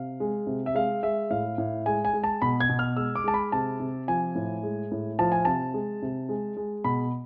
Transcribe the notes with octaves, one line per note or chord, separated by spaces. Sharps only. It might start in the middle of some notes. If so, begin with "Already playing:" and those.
Already playing: C3 F5
G#3
C3
E5
G#3 F5
G#3 E5
A2 F5
A2
G#3 G#5
G#5
G#3
A5
B2 B5
G#6
B2
F6
G#3 E6
D6
G#3 A5
B5
C3 A5
C3
F3 G#5
A2
G#3
A2
F3 A5
G#5
C3 A5
G#3
C3
G#3
G#3
B2 B5